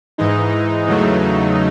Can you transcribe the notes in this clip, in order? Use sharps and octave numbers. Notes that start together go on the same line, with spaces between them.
G#2 E3 G#3 D#4
E2 C#3 F#3 A3